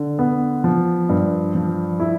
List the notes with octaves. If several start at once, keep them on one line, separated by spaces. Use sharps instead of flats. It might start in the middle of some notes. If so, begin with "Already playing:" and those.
Already playing: D3
B3
F3
G2
F3
E4